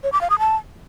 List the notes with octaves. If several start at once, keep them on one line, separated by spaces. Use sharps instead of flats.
C#5
D6
F5
D#6
A5